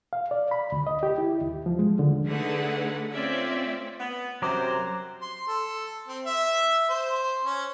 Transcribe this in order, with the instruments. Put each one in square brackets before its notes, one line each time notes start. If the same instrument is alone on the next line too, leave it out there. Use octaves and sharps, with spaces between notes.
[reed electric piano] F5
D5
B5
D2
D#5
G4
E4
D#2
F3
G#3
D3
[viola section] D3 A3 D#4 G#4 B4 F#5
A3 C4 C#4 F4 D5 E5
[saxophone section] B3
[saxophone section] F#2 C3 C5 [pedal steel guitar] F#3 A#5 D6
[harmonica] C6
A4
C4
E5
C5
C#4